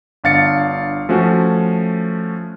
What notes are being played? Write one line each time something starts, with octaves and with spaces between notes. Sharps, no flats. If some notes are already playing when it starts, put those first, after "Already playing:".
G1 D4 F5 A6 C#7
F3 A3 C#4 F#4